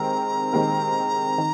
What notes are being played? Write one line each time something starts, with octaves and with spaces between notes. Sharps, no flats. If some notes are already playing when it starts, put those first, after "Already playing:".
Already playing: D#3 G#3 C4 G4 A#4 A#5
D#3 G#3 C4 G4 A#4
D#3